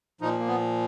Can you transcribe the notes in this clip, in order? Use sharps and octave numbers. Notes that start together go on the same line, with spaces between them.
A#2 F3 D#4
A#3
B3